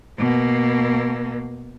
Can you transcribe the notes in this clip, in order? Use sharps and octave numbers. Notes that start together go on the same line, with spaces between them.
B2 A#3